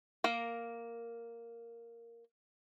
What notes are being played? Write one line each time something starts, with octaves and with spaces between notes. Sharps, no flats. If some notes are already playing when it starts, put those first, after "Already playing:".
A#3 A#4